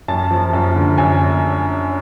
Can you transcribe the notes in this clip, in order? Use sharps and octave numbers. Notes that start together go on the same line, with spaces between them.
F#2 A5
F3
F#2
D3
F#2 G#5